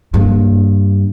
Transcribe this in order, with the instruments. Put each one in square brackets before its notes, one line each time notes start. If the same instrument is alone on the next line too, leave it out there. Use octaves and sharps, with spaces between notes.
[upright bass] G2 A#3